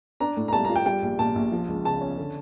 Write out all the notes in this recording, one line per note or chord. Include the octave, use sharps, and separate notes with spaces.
D4 A#5
A2
A#5
G3 A5
A#5
F4
G5
G3 G5
A#1
A#2 A5
A#1
F3
C#2
C#3 A5
C#4
D3